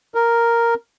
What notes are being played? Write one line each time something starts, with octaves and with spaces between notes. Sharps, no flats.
A#4